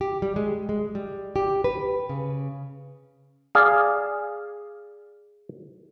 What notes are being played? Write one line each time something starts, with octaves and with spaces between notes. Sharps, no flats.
G4
G3
G#3
G#3
G3
G4
B4
C#3
G#4 D5 F5